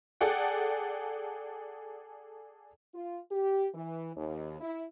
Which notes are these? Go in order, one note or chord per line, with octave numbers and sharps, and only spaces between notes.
G#4 A4 D5 F#5 G5
F4
G4
E3
D#2
E4